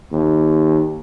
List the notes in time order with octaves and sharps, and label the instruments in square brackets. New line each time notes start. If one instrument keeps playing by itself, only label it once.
[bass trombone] D#2